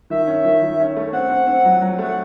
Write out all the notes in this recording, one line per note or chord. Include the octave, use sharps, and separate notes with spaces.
D#3 E5
C#4
D#3
D#3
C#4
A3
C4 F#5
C4
C4
F#3
F#3
A3 F#5